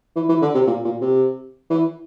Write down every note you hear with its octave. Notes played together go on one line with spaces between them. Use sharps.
E3
E3
D3
C3
A#2
A#2
C3
E3